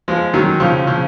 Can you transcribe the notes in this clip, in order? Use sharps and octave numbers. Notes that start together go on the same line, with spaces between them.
F3 G#3
D#3 F#3
C#3 F3
C#3 F3